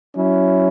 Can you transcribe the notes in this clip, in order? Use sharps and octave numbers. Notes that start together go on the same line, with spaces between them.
F#3 C#4 E4